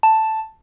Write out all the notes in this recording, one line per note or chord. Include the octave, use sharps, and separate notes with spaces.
A5